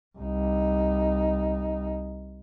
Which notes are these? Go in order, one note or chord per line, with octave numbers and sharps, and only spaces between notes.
C2 D#4